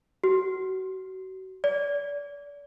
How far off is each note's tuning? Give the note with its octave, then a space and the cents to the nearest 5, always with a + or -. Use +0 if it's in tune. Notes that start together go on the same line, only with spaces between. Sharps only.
F#4 +30
D5 -30